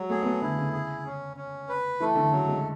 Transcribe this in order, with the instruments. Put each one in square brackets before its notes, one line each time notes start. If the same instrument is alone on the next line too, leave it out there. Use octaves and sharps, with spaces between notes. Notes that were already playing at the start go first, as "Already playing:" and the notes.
Already playing: [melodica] F#3 [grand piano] G#3
[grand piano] A3 [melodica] G#4
[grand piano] B3
A3
[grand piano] D3 [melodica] E4
[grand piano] C#3
[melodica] G#4
C#4
C#4
B4
[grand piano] E3 [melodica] A3
[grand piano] D3
[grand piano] C#3 [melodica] F#3
[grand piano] G#3